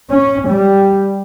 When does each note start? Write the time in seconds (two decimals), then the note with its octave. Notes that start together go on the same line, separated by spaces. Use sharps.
0.10 C#4
0.47 G3